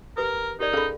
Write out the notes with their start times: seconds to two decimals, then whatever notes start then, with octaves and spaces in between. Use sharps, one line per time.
0.17 G4 A#4 B4 D#6
0.60 D#4 G4 A#4 D5
0.73 C#4 G#4 A4 F5 B5